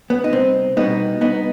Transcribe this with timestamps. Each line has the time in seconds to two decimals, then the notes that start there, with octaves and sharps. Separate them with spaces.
0.10 B3
0.24 D#4
0.32 C2 C4
0.77 B2 G3 B3 D#4
1.21 C2 B3 D#4